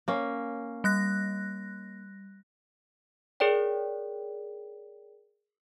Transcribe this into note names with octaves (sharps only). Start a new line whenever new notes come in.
A#3 C#4
G3 F#6 A#6
G#4 A#4 C#5 D5 G5